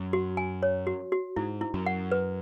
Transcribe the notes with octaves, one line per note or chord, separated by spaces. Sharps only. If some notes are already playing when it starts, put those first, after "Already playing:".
Already playing: F#2
F#4
G#5
C#5
F#4
F#4
G#2 E4
E4
F#2
F#5
B4